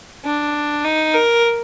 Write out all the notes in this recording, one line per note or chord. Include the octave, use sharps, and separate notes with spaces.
D4
D#4
A#4